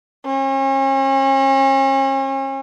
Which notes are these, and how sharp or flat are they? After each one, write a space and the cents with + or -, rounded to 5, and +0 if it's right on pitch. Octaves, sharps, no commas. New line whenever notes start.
C#4 -40